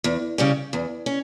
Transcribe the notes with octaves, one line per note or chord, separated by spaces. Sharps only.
E2
C#3 G3 C#4
E2
C#4